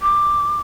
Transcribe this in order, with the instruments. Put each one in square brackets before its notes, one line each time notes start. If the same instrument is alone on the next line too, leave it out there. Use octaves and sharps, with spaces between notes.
[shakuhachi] D6